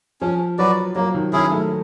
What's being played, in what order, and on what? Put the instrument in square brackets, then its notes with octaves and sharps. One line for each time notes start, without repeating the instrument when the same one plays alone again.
[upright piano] F3 [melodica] C#4
[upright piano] F#3 [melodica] F#4 B4 D5
[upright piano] F#3 [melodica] A#3
[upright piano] D#3
[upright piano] D#3 [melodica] C#4 E4 G#4
[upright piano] A3